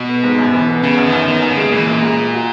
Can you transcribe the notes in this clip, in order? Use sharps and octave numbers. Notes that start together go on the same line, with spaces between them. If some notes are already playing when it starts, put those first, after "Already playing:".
Already playing: B2
B3
G#2
F#2
E3
B3
C#3 B3
F#2
D#3
F#2
D#3 B3
F#2
C#3
G#3
A#2 E3
F#2
G#3
A#3
F#4